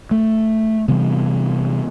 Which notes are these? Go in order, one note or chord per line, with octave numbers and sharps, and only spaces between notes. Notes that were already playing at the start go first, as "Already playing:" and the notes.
A3
C3 E3 G3 B3